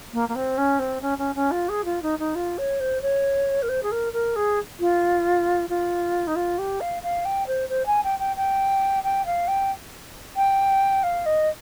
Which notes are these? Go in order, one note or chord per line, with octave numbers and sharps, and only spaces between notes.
A#3
A#3
C4
C#4
C4
C#4
C#4
C#4
F4
G#4
F4
D#4
D#4
F4
C#5
C5
C#5
A#4
C5
G#4
A#4
A#4
G#4
F4
F4
D#4
F4
G4
F5
F5
G5
C5
C5
G#5
G5
G5
G5
G5
F5
G5
G5
F5
D#5